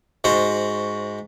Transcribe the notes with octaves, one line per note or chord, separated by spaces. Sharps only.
G#2 F#4 C5